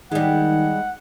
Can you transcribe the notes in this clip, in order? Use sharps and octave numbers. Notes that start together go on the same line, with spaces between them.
D#3 G3 G#3 F#5